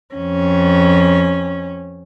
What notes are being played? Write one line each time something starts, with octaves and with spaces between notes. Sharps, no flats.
F2 C#4